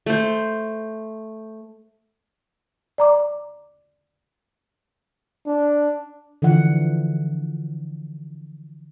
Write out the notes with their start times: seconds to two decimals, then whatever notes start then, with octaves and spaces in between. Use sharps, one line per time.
0.06 A3 C5
2.98 D5 A#5 D6
5.47 D4
6.42 D3 E3 F3 F#5